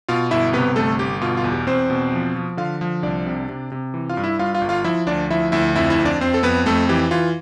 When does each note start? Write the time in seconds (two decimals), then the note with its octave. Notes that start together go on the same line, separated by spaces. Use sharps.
0.08 B2 F4 F5
0.31 G1 E4 E5
0.53 C3 B3 B4
0.76 G1 A3 A4
0.99 G1 G4
1.21 B2 F4
1.37 F4
1.44 E2
1.52 G4
1.67 E2 C4 C5
1.90 B2
2.13 F3
2.36 F3
2.57 D3 F4 F5
2.81 F3
3.03 C2 D4 D5
3.26 C3
3.49 C3
3.72 C3
3.94 E3
4.10 F4 F5
4.17 G2
4.24 E4 E5
4.39 G2 F4 F5
4.54 F4 F5
4.61 G1
4.69 F4 F5
4.84 F3 E4 E5
5.07 D2 D4 D5
5.31 F3 E4 E5
5.52 D2 E4 E5
5.76 F2 E4 E5
5.90 E4 E5
5.98 F2
6.05 D4 D5
6.20 F2 C4 C5
6.34 A4
6.43 F2 B3 B4
6.66 F2 A3 A4
6.89 E3 G4
7.11 E3 F4